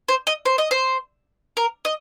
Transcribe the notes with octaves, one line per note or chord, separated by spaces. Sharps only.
C5
D#5
C5
D#5
C5
A#4
D#5